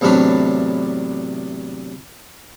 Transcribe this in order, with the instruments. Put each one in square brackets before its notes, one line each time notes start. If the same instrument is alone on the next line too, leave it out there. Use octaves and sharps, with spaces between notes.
[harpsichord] E2 A2 C3 F#3 D4 B4